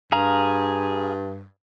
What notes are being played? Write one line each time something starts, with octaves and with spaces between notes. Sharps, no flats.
G2 G#4 F5 A#5